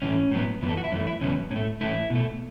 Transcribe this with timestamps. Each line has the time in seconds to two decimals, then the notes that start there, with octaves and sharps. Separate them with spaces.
0.02 A2 E3 A3 C#4
0.31 A2 F#3 B3
0.62 F#2 E3 B3
0.69 A4
0.77 F#4
0.84 E4
0.92 F#2 E3 A3 C#4
1.07 E4
1.21 E2 C#3 F#3 B3 C#4
1.51 A2 C#4
1.56 A3
1.81 A2 E3 A3 E4
2.10 B2 A3